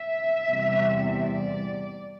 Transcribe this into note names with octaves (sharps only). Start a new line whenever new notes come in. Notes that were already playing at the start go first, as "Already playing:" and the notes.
Already playing: E5
E2 C3 G3
D5